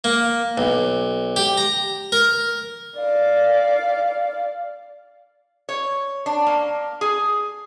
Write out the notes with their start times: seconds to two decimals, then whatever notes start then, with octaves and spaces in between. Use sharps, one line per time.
0.04 A#3
0.58 B1
1.36 G4
1.57 A#5
2.12 A#4
2.97 D5 F5
5.69 C#5
6.26 D4
6.46 A#3
7.01 G#4